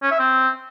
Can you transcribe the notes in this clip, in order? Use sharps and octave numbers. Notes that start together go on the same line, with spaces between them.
C#4
E5
C4